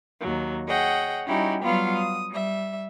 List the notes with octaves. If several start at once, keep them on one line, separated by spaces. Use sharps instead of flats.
D#2 F#3
G#4 C#5 D#5 F#5 G5
G3 C#4 D#4 E4 F#4 G4
F#3 G3 B3 F4 F5 B5
D#6
G3 E5